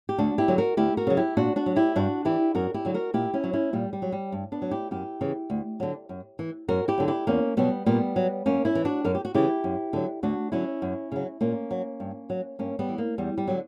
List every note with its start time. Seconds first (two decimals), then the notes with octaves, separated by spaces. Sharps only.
0.09 G4
0.18 D2 D4 F#4
0.38 E4 G4
0.48 D3 F#3
0.58 F#4 A#4
0.77 D2 E4 G4
0.97 F#4 A#4
1.07 C#3 F#3
1.17 E4 G4
1.37 A#2 D4 F#4
1.56 D4 F#4
1.66 F#3
1.76 E4 G4
1.96 G2 D4 F#4
2.25 E3 E4 G4
2.55 F#2 F#4 A#4
2.74 E4 G4
2.85 D3 F#3
2.94 F#4 A#4
3.14 A#2 E4 G4
3.34 C#4 E4
3.44 F#3
3.53 C#4 E4
3.73 A#2 G3
3.93 G3
4.02 F#3
4.12 G3
4.32 G2
4.52 B3 D4
4.62 F#3
4.71 E4 G4
4.91 F#2 E4 G4
5.21 C#3 E3
5.50 D2
5.80 D3 F#3
6.09 F#2
6.39 E3
6.68 F#2 F#4 A#4
6.88 E4 G4
6.98 D3 F#3
7.08 E4 G4
7.27 E2 A#3 C#4
7.57 B2 F#3 G3 B3
7.86 A#2 G3 B3
8.16 F#3
8.46 F#2 A#3 C#4
8.65 C#4 E4
8.75 E3
8.85 D4 F#4
9.05 F#2 A#4
9.15 G4
9.25 F#4
9.34 C#3 E3 E4 G4
9.64 F#2
9.93 D3 F#3
10.23 D2 D4 F#4
10.52 D3 F#3 C#4 E4
10.82 F#2
11.12 C#3 F#3
11.41 A#2 A#3 C#4
11.71 F#3
12.00 G2
12.30 F#3
12.59 G2 A#3 C#4
12.79 G3 B3
12.89 E3
12.98 A#3
13.18 E2 G3
13.38 G3
13.48 D3 F#3